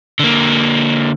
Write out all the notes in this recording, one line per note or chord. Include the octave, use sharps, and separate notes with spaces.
D3 A#3